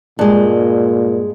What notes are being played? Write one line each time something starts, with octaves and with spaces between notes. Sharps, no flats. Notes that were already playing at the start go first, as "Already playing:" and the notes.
G2 A#2 G#3